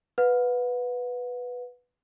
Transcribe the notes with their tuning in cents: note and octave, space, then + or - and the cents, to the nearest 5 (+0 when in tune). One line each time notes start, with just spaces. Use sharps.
B4 +0 F#5 -40